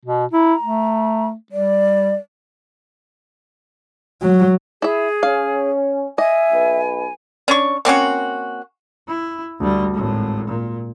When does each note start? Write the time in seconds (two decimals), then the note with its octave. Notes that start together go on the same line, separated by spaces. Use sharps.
0.05 B2
0.33 E4 A#5
0.62 A3
1.52 G3 D5
4.22 F#3
4.82 E4 G#4 E5
5.23 C#4 F5
6.18 D#5 E5 G#5
6.51 B1 B4
7.48 C#4 D4 C#6
7.85 A#3 C4 C#4 F#4
9.08 E4
9.60 D2 G3
9.94 G#1 A2
10.47 A#2